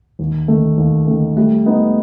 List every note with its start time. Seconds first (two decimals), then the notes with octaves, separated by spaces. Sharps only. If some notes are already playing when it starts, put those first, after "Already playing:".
0.19 D#2
0.48 D#3 A3
0.78 D#2
1.07 D#3 A3
1.37 G3 A3
1.66 B3 D#4